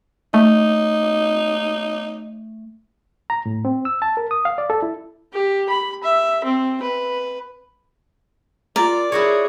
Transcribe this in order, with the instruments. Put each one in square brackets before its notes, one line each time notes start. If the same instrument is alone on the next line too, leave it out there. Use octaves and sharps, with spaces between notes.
[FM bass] A3 [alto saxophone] D#4
[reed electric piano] A#5
A2
C4
E6
A5
A#4
D#6
F5
D5
A4
E4
[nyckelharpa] G4
B5
E5
C4
B4
[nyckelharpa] F4 [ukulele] A#4 [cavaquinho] D5
[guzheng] E4 F#4 C#5 [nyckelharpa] G#4